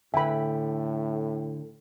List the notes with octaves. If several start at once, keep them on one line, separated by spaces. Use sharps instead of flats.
A2 D3 E5 G5 G#5 B5